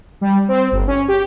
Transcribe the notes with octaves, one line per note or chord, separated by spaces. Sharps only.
G3
C4
G1
C#4
G4